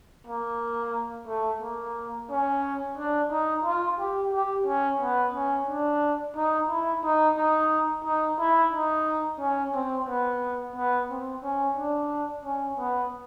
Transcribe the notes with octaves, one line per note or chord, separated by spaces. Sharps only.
A#3
A3
A#3
C#4
D4
D#4
F4
G4
G4
C#4
B3
C#4
D4
D#4
E4
D#4
D#4
D#4
E4
D#4
C#4
C4
B3
B3
C4
C#4
D4
C#4
B3